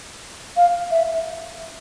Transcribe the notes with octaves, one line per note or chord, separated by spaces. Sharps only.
F5
E5